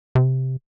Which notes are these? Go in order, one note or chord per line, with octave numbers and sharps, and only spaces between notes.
C3